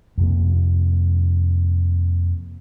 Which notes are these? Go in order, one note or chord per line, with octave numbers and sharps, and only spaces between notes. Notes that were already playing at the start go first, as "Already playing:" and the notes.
F2 C3 A#3